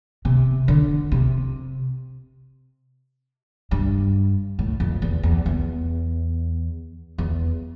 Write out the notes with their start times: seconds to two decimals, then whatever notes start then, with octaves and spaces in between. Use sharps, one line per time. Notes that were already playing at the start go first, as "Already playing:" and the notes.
0.25 C3
0.68 D3
1.12 C3
3.71 G2
4.59 A2
4.80 F2
5.02 E2
5.23 E2
5.46 E2
7.18 E2